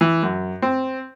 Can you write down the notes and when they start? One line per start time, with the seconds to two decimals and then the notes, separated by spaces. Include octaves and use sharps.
0.01 E3
0.23 F#2
0.62 C4